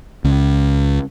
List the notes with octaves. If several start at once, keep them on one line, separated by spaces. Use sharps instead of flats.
C#2